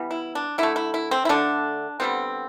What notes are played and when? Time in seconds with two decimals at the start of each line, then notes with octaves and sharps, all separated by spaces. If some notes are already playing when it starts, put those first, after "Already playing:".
Already playing: E3 G3 B3
0.11 E4
0.35 D4
0.58 D3 A3 E4
0.76 E4
0.94 E4
1.11 C4
1.25 E4
1.29 D3 A3 D4
2.00 D3 G3 B3 C4